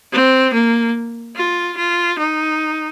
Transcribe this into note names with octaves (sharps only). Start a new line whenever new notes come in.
C4
A#3
F4
F4
D#4